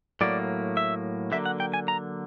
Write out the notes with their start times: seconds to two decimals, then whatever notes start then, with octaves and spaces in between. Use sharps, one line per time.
0.21 A2 F#3 A#3 D5
0.77 E5
1.32 D3 F#3 A#3 E5
1.46 F#5
1.60 G5
1.74 G#5
1.88 A#5